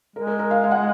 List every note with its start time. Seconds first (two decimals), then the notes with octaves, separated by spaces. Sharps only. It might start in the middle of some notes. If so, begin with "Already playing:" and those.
0.16 G#3 A#4
0.27 A#4
0.39 A#4
0.51 F5
0.63 F5
0.71 F#5